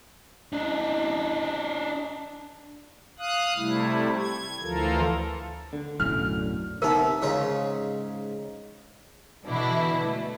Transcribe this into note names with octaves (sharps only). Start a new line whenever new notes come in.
D4 D#4
F5 D#6 F#6
C3 G3 A3 E4
G#6
D2 E3 F3 F4 A4 A#4
D3
B1 F#2 A2 F6
C3 B3 D#4 A#4
G#2 C#3 F4
B2 D3 E3 D4 E4
A3